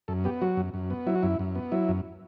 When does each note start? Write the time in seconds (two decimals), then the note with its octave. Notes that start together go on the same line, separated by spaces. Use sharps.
0.08 F#2 A4
0.24 B3 G4
0.41 F#3 F#4
0.57 F#2
0.74 F#2
0.90 B3
1.07 F#3 E4
1.15 F#4
1.23 F#2 E4
1.39 F#2
1.55 B3
1.72 F#3 E4
1.89 F#2